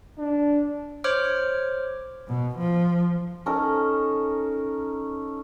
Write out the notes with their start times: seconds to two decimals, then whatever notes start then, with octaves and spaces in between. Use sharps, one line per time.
0.19 D4
1.04 C5 C#5 D6 F6
2.28 B2
2.58 F3
3.46 C#4 D#4 A4 A#4